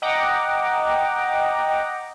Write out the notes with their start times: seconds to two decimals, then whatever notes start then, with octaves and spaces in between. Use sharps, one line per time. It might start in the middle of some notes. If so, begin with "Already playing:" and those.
0.02 D#5 F#5 G5 A#5 D6